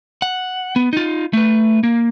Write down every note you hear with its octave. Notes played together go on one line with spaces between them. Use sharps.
F#5
B3
D#4 F4
A3 B4
A#3